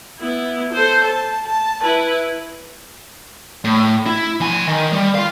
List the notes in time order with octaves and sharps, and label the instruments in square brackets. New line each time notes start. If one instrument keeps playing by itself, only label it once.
[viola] B3 E4
A4 C5
A5
A5
E4 B4
[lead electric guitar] A2
E4
F3 G#5
D#3
G3
F4 F5